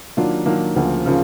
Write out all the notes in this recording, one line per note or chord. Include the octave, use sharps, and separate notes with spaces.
D#3 F#3 A#3 D4 F4
D#3 F#3 A#3 D4 F4
D2 C#3 F3 A#3
C#3 F3 A#3